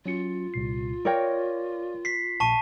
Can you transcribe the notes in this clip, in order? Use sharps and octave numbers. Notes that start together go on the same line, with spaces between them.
F#3 C#4 F4 C#7
C2 A#2 C7
A#4 C#5 D5 F5 G5 A#6
B6 C7
A#1 A#2 A5 C#6 D#7